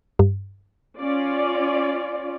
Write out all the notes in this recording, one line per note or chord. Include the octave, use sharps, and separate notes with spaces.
G2
C#4 F4 D5